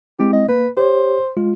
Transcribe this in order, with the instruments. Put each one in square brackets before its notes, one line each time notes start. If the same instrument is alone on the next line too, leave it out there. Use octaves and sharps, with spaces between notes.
[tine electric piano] G#3 C4 E4 [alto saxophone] G4
[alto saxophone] D#5
[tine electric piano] A#3 [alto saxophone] B4
[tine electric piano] G4 C#5 [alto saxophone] C5
[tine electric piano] G#3 F4